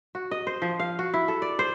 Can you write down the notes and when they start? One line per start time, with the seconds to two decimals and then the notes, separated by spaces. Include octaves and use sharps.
0.15 F#4
0.31 D#5
0.47 C5
0.62 F3
0.80 F5
0.99 F#4
1.14 E4
1.28 A4
1.42 D5
1.59 C5